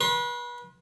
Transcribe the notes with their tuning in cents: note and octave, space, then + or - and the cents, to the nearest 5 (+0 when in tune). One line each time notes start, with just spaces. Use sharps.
B4 -35 C6 +20